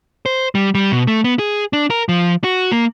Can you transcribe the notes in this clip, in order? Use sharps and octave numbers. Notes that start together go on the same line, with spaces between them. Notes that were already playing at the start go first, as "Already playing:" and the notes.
C5
G3
G3
B2
A3
B3
G#4
D4
A#4
F3
F#4
A#3